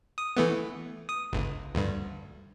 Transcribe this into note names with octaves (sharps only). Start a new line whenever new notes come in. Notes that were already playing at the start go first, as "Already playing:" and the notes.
D#6
E3 A3 B3
D#6
G1 C#2
D2 G2